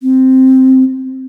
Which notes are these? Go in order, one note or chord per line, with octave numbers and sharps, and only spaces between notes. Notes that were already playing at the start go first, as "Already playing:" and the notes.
C4